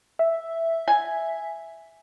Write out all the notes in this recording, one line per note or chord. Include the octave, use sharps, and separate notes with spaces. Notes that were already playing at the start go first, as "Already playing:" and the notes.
E5
G#5